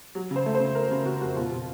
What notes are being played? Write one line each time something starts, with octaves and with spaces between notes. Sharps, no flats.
F#3
C#3
C5
A3
C5
C#3
A3 A#4
C#3
C#3 F#4
F2 F#4
B2 F4
B2